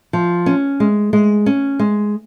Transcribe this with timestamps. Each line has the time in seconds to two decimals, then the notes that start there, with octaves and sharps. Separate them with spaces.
0.13 F3
0.46 C#4
0.80 G#3
1.13 G#3
1.46 C#4
1.79 G#3